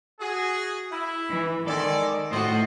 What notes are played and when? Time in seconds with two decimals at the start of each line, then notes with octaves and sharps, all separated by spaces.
0.20 F#4 G#4
0.92 E4
1.29 E3
1.67 D#3 G#3 A4 D5
2.31 A2 F4 F#4 C5 D#5